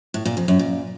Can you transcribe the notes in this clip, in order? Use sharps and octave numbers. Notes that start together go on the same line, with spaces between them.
A2
A#2
F2
F#2
A#2